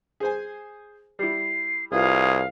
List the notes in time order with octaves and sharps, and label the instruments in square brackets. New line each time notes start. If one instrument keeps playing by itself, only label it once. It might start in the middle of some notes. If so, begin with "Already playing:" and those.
[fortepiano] G#4 C5 G#5
[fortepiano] G3 E4 [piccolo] C7
[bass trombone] C2 [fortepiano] F4 B4 [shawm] G#4 [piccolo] F5